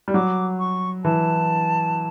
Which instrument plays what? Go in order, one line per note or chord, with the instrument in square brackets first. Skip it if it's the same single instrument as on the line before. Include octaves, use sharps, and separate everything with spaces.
[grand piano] G3
[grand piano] F#3 [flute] D6
[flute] C#6
[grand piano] E3 [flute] A5